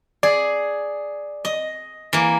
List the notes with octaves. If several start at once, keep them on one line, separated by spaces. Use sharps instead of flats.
G#4 D5
D#5
E3 A#3